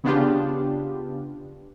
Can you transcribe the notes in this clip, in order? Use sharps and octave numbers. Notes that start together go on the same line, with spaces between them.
C#3 B3 D4 F4 G4